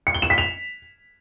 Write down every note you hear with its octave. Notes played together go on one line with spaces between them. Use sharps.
C#7
G7
E7
B6
F7